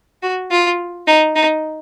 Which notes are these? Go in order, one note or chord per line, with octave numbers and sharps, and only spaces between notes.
F#4
F4
D#4
D#4